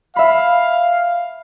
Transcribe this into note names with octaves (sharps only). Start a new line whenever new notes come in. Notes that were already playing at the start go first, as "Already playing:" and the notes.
E5 F5 B5